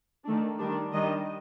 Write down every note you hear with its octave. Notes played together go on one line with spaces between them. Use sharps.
D#3 A3 D4
D#3 G3 D4
D#3 G3 D4 D#5